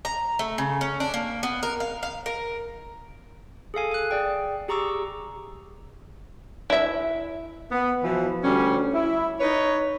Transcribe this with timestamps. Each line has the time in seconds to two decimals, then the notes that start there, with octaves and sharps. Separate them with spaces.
0.05 A#5
0.39 A3
0.58 C#3
0.81 C#4
1.00 D4
1.14 A#3
1.43 B3
1.63 A#4
1.80 F5
2.03 F5
2.26 A#4
3.74 G#4 A4 F5 G#5
3.91 G#5 F#6
4.11 G#4 D5 G5
4.68 G4 G#4 A#5 C#6 D6 E6
6.70 E4 E5
7.72 B3
8.03 B2 E3 F3
8.44 D2 G3 C#4
8.94 E4
9.40 D#4 B4 C#5